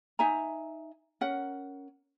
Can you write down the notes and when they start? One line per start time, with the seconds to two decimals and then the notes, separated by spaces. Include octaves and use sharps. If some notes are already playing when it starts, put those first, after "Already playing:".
0.19 D#4 E5 G#5 A#5
1.21 C#4 A#4 F#5